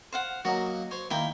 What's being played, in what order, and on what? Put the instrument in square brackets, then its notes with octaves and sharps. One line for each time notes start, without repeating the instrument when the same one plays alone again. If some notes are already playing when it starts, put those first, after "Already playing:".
[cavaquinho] C5 F5 F#5
[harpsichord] F#3 A#3 D#4 [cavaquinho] F#4
[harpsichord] C5 [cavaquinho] C#5
[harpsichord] D#3 A#3 [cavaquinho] E4 G5